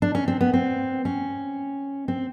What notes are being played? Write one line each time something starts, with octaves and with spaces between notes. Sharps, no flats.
D4
C#4
C4
B3
C4
C#4
C4